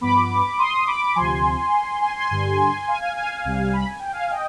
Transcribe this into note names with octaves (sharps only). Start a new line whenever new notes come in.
G2 F3 B3 B5 D6
C6 D#6
B5 D6
D2 C3 F3 G#5 C6
G#5 C6
G#5 C6
G2 D3 G3
F5 G#5
F5 G#5
F5 G#5
C2 C3 G3
B5
G#5
G5
F5 G#5
D#5 G5